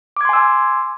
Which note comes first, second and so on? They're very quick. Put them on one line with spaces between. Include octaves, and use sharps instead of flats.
D6 G#6 C6 G#5 E6